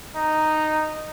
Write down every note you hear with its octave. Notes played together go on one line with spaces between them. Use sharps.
D#4